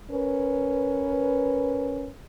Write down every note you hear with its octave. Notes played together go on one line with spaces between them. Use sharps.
C#4 A#4 B4